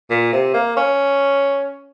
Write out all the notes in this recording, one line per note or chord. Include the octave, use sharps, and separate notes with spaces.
A#2
C3
A#3
C#4